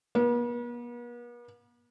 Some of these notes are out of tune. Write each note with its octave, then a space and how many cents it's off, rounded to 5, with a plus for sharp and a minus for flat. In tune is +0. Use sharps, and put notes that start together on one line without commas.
B3 -45